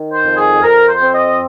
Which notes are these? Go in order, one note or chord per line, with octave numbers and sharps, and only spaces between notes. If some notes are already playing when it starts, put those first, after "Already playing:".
Already playing: D#3
C5
F2
G#4
F2 A#4
C5
C4
D#5